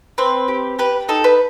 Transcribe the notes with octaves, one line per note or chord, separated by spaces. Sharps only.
C4 B4
G4
G4 B4
D#4 A4
B4